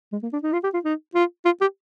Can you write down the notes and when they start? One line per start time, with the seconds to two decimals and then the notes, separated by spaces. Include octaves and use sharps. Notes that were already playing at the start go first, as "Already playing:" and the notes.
0.13 G#3
0.23 A#3
0.33 D4
0.43 D#4
0.53 F4
0.64 G4
0.74 F4
0.85 D#4
1.15 F4
1.45 F4
1.61 G4